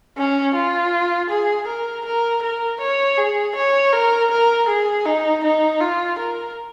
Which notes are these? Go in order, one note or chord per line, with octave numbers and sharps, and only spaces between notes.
C#4
F4
G#4
A#4
A#4
A#4
C#5
G#4
C#5
A#4
A#4
G#4
D#4
D#4
F4
A#4